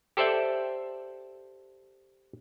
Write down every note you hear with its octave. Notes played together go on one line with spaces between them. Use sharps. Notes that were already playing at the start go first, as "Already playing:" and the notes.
G4 A4 C5 D5 E5 G5